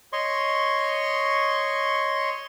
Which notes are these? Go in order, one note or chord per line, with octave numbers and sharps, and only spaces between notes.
C#5 D#5 C6 C#6